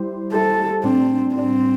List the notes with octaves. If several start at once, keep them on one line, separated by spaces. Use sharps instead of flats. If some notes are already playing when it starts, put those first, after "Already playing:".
Already playing: G3 E4 G4 C5
G3 E4 G4 A4 C5
A2 G3 C4 D4
A2 G3 C4 D4